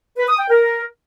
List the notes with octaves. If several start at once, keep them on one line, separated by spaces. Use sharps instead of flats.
B4
D#6
G5
A#4